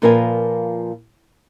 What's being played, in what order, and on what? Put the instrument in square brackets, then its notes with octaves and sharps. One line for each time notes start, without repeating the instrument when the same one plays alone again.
[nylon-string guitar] A#2 F3 A#4 B4 D5 G#5